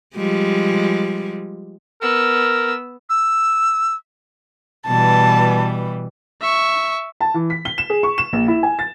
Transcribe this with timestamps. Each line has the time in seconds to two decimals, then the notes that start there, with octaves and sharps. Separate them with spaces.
0.15 F3 G3 G#3
2.02 B3 A#4 E6
3.10 E6
4.87 B2 E3 G3 A5
6.41 E5 C#6
7.21 A5
7.34 E3
7.50 B6
7.65 G7
7.78 E7
7.90 G#4
8.03 C#6
8.18 E7
8.33 A#1
8.48 E4
8.63 G#5
8.79 A6